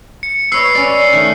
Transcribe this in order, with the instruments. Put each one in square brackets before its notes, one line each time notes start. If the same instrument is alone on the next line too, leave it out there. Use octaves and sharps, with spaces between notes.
[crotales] C#7
[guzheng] B4 C#5 D#5 [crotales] E6 C7
[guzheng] C#4 D5
D#3 A3